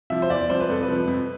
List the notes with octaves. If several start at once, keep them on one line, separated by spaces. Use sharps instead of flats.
C3 F3 E5
C5
E2 D5
C3 F3 C5
B4
F2 A4
B4
C3 F3
F2